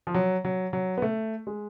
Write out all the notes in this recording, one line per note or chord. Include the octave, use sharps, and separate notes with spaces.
F3
F#3
F#3
F#3
B3
A3
G#3